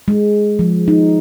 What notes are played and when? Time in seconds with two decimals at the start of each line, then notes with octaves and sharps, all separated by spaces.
0.08 G#3
0.59 F3
0.88 D#4